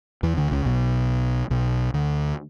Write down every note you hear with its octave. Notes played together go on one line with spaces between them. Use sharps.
E2 E3
D2 D3
C#2 C#3
B1 B2
B1 B2
D2 D3